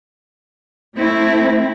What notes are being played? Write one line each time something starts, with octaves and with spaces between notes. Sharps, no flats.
A3 C4 E4